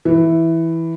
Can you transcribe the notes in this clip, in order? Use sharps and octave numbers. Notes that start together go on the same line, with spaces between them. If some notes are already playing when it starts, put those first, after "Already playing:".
E3